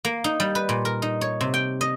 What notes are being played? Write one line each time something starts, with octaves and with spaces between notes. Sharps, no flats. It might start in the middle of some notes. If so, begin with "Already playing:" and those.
A#3
D#4
G3
B4
A#2
A#4
D#4
C#5
C3
G5
D#5